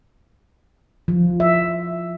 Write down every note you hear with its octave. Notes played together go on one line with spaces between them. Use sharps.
F3
E5